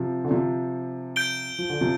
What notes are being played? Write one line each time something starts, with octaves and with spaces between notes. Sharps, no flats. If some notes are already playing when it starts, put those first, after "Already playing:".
Already playing: C3 F3
D3
C3 F3
G6 D7 G7
F3
D3
C3 F3